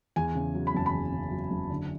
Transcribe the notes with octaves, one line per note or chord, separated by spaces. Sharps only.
E2 G#5
C#3
F#3
B5
F#1 A5
B5
E2
C#3
F#3
F#1
D3